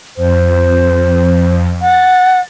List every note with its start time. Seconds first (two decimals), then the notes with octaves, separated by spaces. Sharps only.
0.17 F2 C5
1.81 F#5 A6